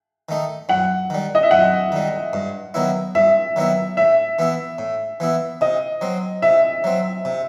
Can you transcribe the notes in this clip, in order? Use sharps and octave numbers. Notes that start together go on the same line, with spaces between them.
D#3 A3 D#4
F#2 F#5
D#3 G3
D#5
E5
F#2 F#5
D#3 G3
G2
D#3 F#3 B3 E4
G2 E5
D#3 F#3 B3 E4
A2 E5
E3 B3 E4
A2
E3 B3 E4
C3 D#5
F#3 C4
C3 E5
F#3 C4
C3